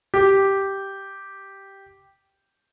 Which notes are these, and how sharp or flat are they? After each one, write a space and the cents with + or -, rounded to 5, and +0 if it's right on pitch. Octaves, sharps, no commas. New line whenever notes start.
G4 -5